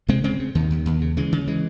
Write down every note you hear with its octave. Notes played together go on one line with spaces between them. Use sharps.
C3 G#3 C4
C#3 G#3 C4
C#3
D#2 D#3
D#2
D#2
C#3
C#3 E3 G#3
C#3
E3 G#3